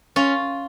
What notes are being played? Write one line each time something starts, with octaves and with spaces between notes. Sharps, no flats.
C#4 F4